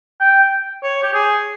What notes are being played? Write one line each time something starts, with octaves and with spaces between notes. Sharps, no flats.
G5
C#5
G4
G#4